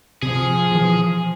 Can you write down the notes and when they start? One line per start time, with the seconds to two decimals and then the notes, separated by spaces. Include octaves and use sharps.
0.22 C3 F3 G#4
0.71 B2 E3